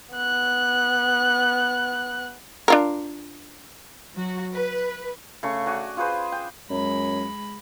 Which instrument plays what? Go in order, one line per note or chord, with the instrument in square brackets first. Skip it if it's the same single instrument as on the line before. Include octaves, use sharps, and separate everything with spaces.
[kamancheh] B3 F#6
[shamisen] D4 F4 A#4
[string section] F#3 F#4
B4
[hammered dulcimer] C#3 A3 C#5 C#6
F#4 D5 G#5
F4 G#4 B4 C5
G5
[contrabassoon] F#2 [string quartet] G#3 B5